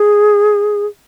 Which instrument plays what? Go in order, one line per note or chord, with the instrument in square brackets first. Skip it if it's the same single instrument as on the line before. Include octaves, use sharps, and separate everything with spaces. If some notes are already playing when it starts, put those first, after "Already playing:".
Already playing: [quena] G#4